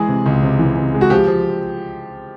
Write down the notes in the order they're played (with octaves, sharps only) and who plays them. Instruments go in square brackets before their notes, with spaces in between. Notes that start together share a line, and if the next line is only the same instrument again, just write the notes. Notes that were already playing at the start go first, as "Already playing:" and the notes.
Already playing: [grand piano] E3 G#3 G#4
C3
C#2
C3
E3
C3
G#3
F#4
F3 G4
F3